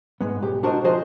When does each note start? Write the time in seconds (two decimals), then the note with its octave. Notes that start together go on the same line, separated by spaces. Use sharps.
0.21 G#2 G#3 B3
0.42 B1 G4
0.63 D4 F#4 A#4 C5 D#5
0.84 F3 F4 G#4 C5 D#5